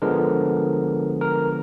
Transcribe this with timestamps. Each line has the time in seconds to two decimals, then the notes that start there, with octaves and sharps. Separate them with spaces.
0.02 D3 F3 G#3 B3 A#4
1.21 A#4